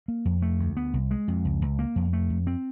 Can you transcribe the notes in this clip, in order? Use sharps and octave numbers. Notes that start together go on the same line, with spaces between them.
A#3
F2
A3
D2
B3
C2
G#3
F2
C#2
C#2
A#3
F2
A3
F2
C4